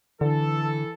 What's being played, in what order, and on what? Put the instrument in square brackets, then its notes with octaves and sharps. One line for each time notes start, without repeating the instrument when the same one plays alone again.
[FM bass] D3 [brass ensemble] E3 A4